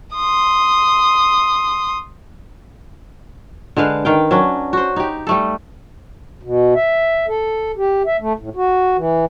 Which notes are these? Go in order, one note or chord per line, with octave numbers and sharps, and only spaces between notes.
C6 D#6
D3 G#3 B4 F5
D#3 F5 G5
F#3 C#4 D4
F#4 C5
D#4 G4
G3 A3 A4
B2
E5
A4
G4
E5
A3
A2
F#4
E3